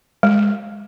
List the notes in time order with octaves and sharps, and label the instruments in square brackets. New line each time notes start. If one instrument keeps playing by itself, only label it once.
[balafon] G#3